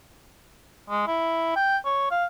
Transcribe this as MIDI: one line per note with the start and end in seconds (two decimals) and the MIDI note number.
0.90 1.05 56
1.07 1.55 64
1.56 1.77 79
1.85 2.10 73
2.11 2.25 77